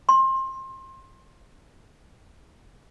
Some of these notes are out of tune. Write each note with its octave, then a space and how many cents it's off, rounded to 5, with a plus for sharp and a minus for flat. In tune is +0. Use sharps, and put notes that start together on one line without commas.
C6 +25